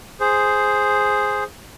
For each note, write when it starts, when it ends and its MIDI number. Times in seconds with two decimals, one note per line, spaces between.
0.20 1.44 68
0.20 1.44 72